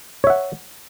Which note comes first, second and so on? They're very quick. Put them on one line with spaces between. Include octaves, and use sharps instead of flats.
C#5 E5 F#5